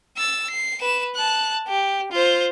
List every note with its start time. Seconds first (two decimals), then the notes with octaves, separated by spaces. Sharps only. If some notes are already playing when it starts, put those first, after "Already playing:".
0.17 E6 A6
0.50 C7
0.81 B4 E7
1.15 A5 F#6
1.68 G4
2.12 F4 C5